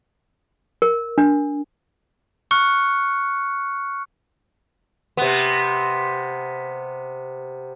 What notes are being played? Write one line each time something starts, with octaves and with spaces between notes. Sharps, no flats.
A#4
D4
C#6 F6 F#6 C#7
C3 B3